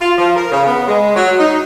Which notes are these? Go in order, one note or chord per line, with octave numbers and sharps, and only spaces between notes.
F4
F3
A#4
C#3
B3
G#3
F#3
D#4